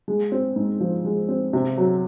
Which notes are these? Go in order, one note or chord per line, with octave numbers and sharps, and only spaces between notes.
G#3
C4
G#2
F3
G#3
C4
C3
F#3